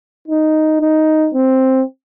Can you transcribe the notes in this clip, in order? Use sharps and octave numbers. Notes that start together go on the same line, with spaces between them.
D#4
D#4
C4